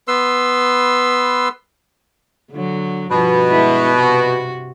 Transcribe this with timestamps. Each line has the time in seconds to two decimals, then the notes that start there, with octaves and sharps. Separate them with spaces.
0.08 B3 B4 C6 E6
2.51 D3 F#3
3.11 G2 B2 F3
3.49 G#3 E4 B4
3.97 C3 F#4